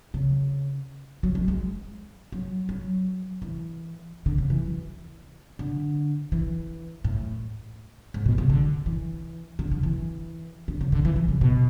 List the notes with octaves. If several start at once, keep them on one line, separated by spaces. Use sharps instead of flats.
C#3
F#3
G#3
G#3
F#3
F#3
E3
D3
C#3
E3
D3
E3
A2
G#2
B2
C#3
D3
E3
D3
D3
E3
D3
C#3
D3
E3
E3
C#3
B2